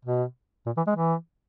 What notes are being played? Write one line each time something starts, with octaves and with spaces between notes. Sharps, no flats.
B2
A#2
E3
G#3
E3